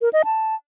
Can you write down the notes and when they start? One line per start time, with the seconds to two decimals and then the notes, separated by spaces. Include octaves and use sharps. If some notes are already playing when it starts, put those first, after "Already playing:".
0.02 A#4
0.13 D#5
0.25 A5